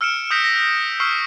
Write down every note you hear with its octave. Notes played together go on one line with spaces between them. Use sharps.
E6 F6 C#7 D7 E7
D#6 F6 G6 A#6 B6 D7
A#6
A#6
C#6 E6 F6 B6 C7